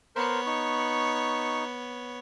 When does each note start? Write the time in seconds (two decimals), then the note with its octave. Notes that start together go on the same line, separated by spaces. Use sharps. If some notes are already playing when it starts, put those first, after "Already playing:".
0.16 B3 A#4 C5 C#5
0.46 D#4 C#6